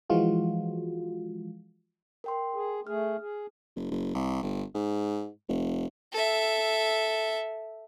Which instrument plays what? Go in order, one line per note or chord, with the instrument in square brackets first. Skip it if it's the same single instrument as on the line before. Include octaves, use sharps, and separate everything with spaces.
[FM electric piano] E3 F3 G#3 F4 F#4
[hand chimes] A#4 G5 C6
[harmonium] G#4
[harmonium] A3 G#4 [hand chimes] F6
[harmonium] G#4
[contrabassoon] F#1
F#1
C2
G1
G#2
F1
[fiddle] A4 E5